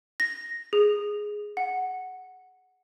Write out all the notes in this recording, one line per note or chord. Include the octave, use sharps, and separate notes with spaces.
A#6
G#4
F#5